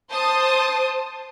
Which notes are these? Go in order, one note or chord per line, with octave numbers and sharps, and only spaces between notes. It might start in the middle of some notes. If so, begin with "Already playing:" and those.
C5 A5 D#6